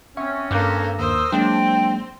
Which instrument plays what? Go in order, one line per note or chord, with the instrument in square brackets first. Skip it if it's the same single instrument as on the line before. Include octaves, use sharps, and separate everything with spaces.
[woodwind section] C4 C#4 [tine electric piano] E5 F#5 C#6
[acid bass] G2 [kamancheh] A#3 A4 [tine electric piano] D6 F#6 G6
[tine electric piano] D#2 [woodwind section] A#4 D#6 E6 [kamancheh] C5
[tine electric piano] F#3 G#3 A#3 [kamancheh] C4 [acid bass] D4 [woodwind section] G5